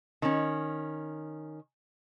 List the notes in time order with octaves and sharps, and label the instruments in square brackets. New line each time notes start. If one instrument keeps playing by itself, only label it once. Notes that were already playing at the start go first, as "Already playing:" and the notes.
[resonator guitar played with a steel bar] D#3 C#4